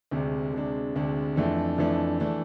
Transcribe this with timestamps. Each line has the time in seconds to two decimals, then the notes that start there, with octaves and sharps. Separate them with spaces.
0.11 D2 C3 G#3 D4
0.53 D2 C3 G#3 D4
0.95 D2 C3 G#3 D4
1.36 F2 E3 A3 D4
1.78 F2 E3 A3 D4
2.20 E3 A3 D4